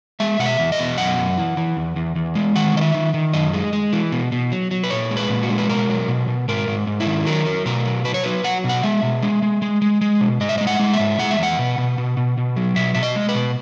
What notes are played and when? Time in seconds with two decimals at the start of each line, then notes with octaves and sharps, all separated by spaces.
0.20 G#3 E5
0.39 B2 F#5
0.46 E5
0.59 E2
0.72 D#5
0.79 B2
0.98 F#2 F#5
1.18 F#2
1.38 E3
1.57 E3
1.77 E2
1.96 E2
2.16 E2
2.35 G#3
2.55 D#3 F#5
2.75 D#3 D#5
2.81 E5
2.94 D#3
3.14 D#3
3.33 F#2 D#5
3.54 G#3
3.73 G#3
3.93 E3
4.12 B2
4.32 B2
4.52 F#3
4.71 F#3
4.84 B4
4.90 A#2 C#5
5.11 G#3
5.17 B4
5.30 A#2
5.43 F#4
5.50 G#3
5.58 B4
5.69 B2 A#4
5.89 F#3
6.08 B2
6.28 B2
6.48 G#2 A#4
6.68 G#2
6.87 G#2
7.00 E4
7.06 D#3
7.26 F#3 A#4
7.46 F#3
7.66 B2 A#4
7.85 F#3
8.05 F#3 B4
8.14 C#5
8.24 F#3 B4
8.44 F#3 F#5
8.64 B2
8.69 F#5
8.83 G#3 E5
9.03 B2
9.22 G#3
9.42 G#3
9.62 G#3
9.82 G#3
10.01 G#3
10.21 B2
10.41 G#2 D#5
10.49 E5
10.58 G#3 D#5
10.67 F#5
10.79 G#3
10.93 E5
10.99 G#2
11.19 G#3 F#5
11.31 E5
11.39 E2 F#5
11.59 B2
11.78 B2
11.98 B2
12.17 B2
12.37 B2
12.56 F#3
12.76 B2 E5
12.94 B2 E5
13.03 D#5
13.16 G#3
13.29 B4
13.35 B2